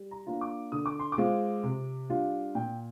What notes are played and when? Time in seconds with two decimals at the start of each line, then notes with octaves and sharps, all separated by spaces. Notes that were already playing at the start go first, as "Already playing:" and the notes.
Already playing: G3
0.11 A#5
0.27 A#3 D4 F4
0.41 D6
0.72 D3 D#6
0.86 D6
0.99 C6
1.12 D6
1.18 G#3 C4 F4
1.63 C3
2.09 G3 D4 F4
2.55 A#2 G5